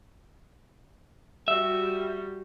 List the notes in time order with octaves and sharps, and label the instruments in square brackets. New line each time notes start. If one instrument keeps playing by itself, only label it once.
[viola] G3 F#4 [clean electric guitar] E5